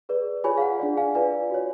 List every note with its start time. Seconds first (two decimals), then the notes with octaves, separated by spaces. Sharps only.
0.09 G#4 B4 D5
0.44 F4 G#4 C#5 G#5 B5
0.58 F5
0.62 F#5
0.79 D4 G#4 D5
0.97 F5 G#5
1.15 F4 B4 D5 F5 G#5
1.50 F#4 C#5